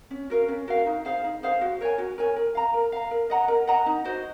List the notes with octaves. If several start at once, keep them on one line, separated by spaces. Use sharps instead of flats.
C#4
F#4 A#4 F5
C#4
F#4 A#4 F5
D#4
G#4 C5 F5
D#4
G#4 C5 F5
F#4
A#4 C#5 G#5
F#4
A#4 C#5 G#5
A#4
F5 A#5
A#4
F5 A#5
A#4
D#5 F#5 A#5
A#4
D#5 F#5 A#5
D#4
F#4 C5 D#5